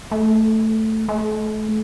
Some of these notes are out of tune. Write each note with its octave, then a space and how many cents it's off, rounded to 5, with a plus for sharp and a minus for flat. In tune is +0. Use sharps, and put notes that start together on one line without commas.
A3 +0
A3 -35